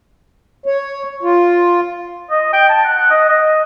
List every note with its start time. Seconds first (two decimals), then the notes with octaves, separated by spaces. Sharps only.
0.66 C#5
1.23 F4
2.30 D#5
2.53 G5
2.69 A5
2.84 F#5
2.96 F#5
3.10 D#5
3.28 D#5